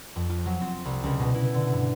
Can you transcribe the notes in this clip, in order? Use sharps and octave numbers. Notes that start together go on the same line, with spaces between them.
F2
F4
F#3
C4
C2
C#2
B2
E4
D3
G2